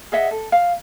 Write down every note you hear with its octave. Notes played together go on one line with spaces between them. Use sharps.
G#4 D#5 E5 F#5
A4
F5